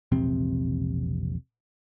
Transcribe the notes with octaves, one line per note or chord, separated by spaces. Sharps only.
E1 A#1 C3 C4